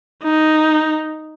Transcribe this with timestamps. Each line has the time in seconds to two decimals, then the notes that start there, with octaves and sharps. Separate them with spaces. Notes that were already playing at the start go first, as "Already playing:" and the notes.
0.23 D#4